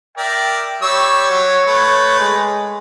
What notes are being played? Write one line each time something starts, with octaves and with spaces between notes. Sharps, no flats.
A#4 D5 E5 G5
G3 C#5 C#6 E6
F#3
A3 B4
G#3